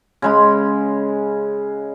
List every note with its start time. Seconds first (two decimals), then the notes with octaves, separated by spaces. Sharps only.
0.22 C#3 G#3 B5